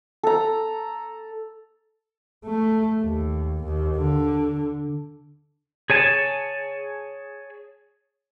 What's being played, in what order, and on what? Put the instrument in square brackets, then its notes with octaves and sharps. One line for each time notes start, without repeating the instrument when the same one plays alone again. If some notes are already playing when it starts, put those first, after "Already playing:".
[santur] A4 A#5
[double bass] A3
D#2
D#2
D3
[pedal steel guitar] G#4 C#5 G#5 A5